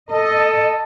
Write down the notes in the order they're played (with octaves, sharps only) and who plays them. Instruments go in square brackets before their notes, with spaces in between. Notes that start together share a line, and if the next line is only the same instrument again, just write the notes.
[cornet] A4 [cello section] D#5